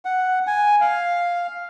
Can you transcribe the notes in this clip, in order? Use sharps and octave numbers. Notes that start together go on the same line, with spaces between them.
F#5
G#5
F5